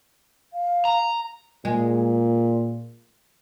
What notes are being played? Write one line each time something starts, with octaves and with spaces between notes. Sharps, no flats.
F5
A#5
A#2 G#3